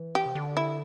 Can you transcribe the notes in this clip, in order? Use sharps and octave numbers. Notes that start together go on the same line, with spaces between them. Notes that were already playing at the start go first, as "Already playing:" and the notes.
Already playing: E3
G4
C3
D3
E4